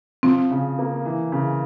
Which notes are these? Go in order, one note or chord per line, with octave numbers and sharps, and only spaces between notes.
F3 C4
C#3
A#3
E3
C#3